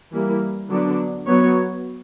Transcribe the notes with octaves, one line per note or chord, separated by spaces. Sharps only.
E3 G3 A#3 E4
D3 F#3 B3 D4
F#3 B3 F#4 C#5